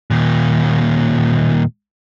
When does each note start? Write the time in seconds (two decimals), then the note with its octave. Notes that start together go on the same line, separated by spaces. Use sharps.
0.11 D#2 A#2